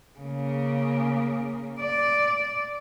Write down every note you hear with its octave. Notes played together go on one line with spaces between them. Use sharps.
C#3 A#3
D5